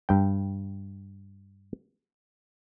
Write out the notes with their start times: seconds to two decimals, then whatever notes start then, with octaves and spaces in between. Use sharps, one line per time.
0.09 G2 G5